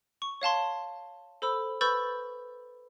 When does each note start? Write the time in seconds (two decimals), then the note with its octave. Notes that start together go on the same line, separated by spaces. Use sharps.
0.22 C#6
0.42 C#5 F5 A5 C6
1.42 A4 C5 B5 E6
1.81 B4 B5 C#6 E6 G6 A6